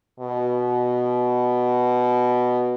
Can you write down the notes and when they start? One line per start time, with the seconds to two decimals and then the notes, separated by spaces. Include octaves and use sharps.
0.20 B2